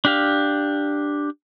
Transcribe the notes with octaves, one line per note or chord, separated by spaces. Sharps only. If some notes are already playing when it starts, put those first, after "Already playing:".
D4 G4 F5